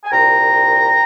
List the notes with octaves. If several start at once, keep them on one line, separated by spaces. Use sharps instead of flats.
G#5
C2 A#2 G5 A#5